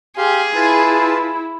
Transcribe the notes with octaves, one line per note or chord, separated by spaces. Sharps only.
G4 G#4 F5 C6
E4 F4 B4 A5